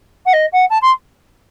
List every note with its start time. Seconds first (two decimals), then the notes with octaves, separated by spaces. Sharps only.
0.26 F#5
0.33 D#5
0.52 F#5
0.70 A5
0.82 C6